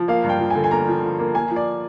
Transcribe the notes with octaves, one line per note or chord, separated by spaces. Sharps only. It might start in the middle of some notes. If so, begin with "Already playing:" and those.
Already playing: F3
A#3 F5
G2
G5
F3
G#5
D3
G#5
A#3 A#5
F3
F3
A#3
A#3 G#5
F3
D5